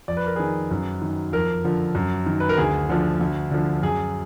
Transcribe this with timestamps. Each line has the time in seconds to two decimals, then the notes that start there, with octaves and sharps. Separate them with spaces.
0.08 F2 D5
0.17 B4
0.26 A#4
0.35 D#3 G#4 B4
0.71 F#2
1.02 D#3
1.33 F2 A#4
1.64 D3 F3
1.95 F#2
2.26 D#3
2.40 B4
2.49 A#4
2.57 D2 G#4
2.89 D3 F3
3.20 D2
3.51 D3 F3
3.82 F#2 G#4